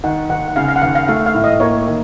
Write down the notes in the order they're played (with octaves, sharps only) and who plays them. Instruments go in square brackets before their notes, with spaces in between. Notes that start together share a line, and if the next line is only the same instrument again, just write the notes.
[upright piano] D#3 [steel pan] F#5
[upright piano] D#2 [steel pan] F#5
[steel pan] F#5
[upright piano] C#3 [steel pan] F5
[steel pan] F5
F#5
[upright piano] D#2 [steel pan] F5
[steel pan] F5
[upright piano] A3 [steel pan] F5
[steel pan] F5
[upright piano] A2
[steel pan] D#5
[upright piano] A#3 [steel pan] C#5
[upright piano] D#3